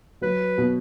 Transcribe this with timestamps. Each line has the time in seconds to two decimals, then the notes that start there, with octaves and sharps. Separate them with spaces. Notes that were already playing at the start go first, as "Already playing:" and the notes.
0.22 F#3 B4
0.58 B2